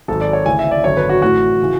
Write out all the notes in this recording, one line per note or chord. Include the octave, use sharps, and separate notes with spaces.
G#1 G#2 F#3 A4
D5
C#5
D2 C#3 E3 G#5
E5
D5
G#1 F#2 D3 F#3 C#5
B4
F#4
A1 A2 E3 F#4
C#3 E3